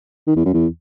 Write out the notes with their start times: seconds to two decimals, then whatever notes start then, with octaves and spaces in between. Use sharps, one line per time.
0.27 D#3
0.36 E2
0.45 F#2
0.54 E2